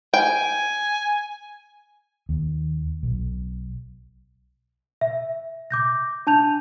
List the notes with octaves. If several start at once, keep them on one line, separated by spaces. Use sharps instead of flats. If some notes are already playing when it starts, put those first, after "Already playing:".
G5 G#5
D#2
B1
E5
D6 G6 A#6
D4 A5 G6 F7